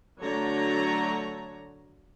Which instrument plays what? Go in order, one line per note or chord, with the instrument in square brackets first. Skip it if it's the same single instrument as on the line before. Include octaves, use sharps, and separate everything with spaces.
[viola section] D3 F#3 A3 C#5 A#5